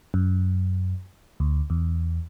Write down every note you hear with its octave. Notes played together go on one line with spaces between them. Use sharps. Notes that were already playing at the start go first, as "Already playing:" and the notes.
F#2
D2
E2